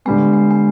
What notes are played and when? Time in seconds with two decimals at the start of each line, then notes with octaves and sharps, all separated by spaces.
0.05 D3 G3 G#3 B3
0.34 G#3
0.51 G#3